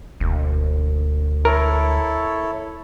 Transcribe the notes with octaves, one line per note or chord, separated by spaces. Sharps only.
E1 D2
E4 A4 A#4 C#5